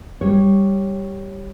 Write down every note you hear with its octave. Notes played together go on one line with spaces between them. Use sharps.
G3 C#5